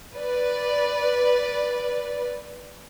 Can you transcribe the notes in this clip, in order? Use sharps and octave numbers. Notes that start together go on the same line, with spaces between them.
B4 D5